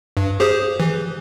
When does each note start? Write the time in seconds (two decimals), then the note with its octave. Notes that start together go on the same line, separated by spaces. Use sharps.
0.17 G2
0.40 G4 G#4 C5
0.80 E3